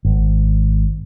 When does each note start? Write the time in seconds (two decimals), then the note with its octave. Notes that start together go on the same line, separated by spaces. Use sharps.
0.05 G#1